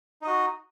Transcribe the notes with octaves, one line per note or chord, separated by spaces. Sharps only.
D#4 F#4 D#5